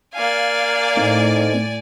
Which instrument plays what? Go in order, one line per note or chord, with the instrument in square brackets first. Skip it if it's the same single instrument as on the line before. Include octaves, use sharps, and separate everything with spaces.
[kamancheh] A#3 F5 [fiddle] D5 G#5
[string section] A2 [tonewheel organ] A3 C4 D#4